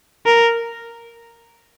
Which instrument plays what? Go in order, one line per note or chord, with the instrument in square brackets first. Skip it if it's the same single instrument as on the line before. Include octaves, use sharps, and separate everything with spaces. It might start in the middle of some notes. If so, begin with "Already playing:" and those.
[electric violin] A#4